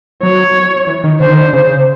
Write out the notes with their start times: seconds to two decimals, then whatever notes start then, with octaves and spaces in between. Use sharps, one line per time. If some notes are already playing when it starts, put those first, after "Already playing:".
0.23 F#3 C#5
0.87 E3
1.04 D#3
1.20 D3 C5
1.30 D#3
1.40 D3
1.53 C#3